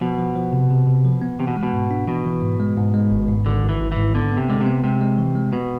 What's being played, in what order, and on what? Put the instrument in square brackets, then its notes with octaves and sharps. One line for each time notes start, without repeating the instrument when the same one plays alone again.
[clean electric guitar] B2 [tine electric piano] F3
[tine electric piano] F3
F3
C3
C3
C3
F3
B3
[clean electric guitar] C3 [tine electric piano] E3
[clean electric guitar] B2
[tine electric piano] G#3
[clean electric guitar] B2
[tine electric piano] G#2
D4
[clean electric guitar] B2 [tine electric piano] E3
[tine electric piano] E3
G#2
G#3
G#2
G#3
G#1
G#2
[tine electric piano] G#1 [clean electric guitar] D3
[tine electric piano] G#1
[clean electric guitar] E3
[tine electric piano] G#1
[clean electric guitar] E3
[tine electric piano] G#2
[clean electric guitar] D3 [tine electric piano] B3
[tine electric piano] B3
[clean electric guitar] C3
[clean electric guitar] D3 [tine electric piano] G#3
[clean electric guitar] C3
[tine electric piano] B3
[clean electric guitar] C3 [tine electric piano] G#3
[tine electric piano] G#3
E3
G#3
[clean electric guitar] B2 [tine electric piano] B3